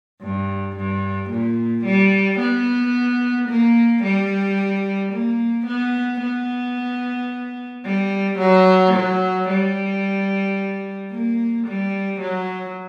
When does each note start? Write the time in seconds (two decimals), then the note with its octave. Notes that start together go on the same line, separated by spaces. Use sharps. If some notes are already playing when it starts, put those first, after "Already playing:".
0.22 G2
0.77 G2
1.30 A#2
1.85 G3
2.40 B3
3.49 A#3
4.04 G3
5.13 A#3
5.67 B3
6.21 B3
7.85 G3
8.39 F#3
8.94 F#3
9.49 G3
11.11 A#3
11.67 G3
12.21 F#3